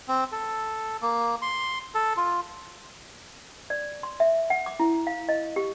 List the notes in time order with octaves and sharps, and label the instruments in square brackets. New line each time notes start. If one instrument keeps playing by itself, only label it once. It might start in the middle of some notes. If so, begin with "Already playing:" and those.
[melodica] C4
A4
A#3
C6
A4
F4
[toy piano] D5
C6
E5
F#5
D6
E4
F5
D#5
G4